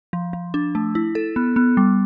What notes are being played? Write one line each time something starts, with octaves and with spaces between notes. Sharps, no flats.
F3
F3
D4
A3
E4
A4
B3
B3
G3